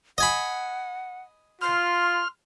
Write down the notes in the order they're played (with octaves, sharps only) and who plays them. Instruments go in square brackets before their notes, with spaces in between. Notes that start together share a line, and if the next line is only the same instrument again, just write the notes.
[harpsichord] D#5 G#5 B5 [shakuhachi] F#5
[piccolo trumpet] F4 [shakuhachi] C6 [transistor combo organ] F6